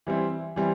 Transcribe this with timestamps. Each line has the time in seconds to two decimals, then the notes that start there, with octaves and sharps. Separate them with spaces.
0.07 E3 G3 C4 E4
0.56 E3 G3 C4 E4